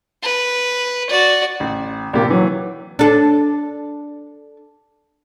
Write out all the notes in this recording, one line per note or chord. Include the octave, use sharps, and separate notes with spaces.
B4
F#4 D5
A1
A#1 C3 A#3 G4
E3 F#3
D4 A4